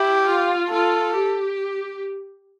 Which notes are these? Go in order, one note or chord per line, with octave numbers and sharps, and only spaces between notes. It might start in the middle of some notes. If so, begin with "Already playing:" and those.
Already playing: E4 G4
F4
F4 A4
G4